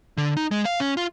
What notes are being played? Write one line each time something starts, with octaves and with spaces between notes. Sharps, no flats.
D3
D#4
G#3
F5
C#4
F4